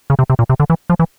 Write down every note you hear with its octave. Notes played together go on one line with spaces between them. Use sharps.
C#3
C3
C3
A#2
C3
D3
E3
F3
E3